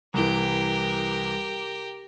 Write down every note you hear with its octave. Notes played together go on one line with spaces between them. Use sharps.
C2 E3 G4 A#4